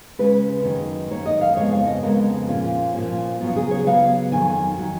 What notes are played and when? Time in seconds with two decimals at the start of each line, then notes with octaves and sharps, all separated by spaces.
0.19 C#3 G#3 C#4 B4
0.64 F#2 D#3 A#3 C#4
1.11 F#2 D#3 A#3 C#4 C#5
1.26 D#5
1.41 F5
1.56 F2 C#3 G#3 B3 C#5
1.72 F5
1.87 D#5
2.03 F2 C#3 G#3 B3 A#4
2.48 A#2 F3 A#3 C#4 F4
2.94 A#2 F3 A#3 C#4
3.40 C#3 F#3 B3 F4
3.56 G#4
3.71 C#5
3.86 C#3 F#3 B3 F5
4.32 F2 D#3 F#3 G#5
4.78 D#3 F#3